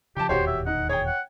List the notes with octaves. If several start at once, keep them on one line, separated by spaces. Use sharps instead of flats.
C#3 F3 G4 G5 A5
E1 D#2 A#2 F#4 G4 C5 C#5
E5
D#4 F#5
G#4 C#5 G5
F#5